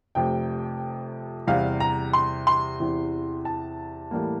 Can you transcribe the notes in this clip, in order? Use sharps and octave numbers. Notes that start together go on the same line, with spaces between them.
F1 F2 C3 G5
E2 C3 G3 F5
A#5
C6
C6
E2 C3 E3
A5
A2 E3 G3 A#3